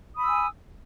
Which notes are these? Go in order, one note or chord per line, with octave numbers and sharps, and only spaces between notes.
G#5 B5 D#6 E6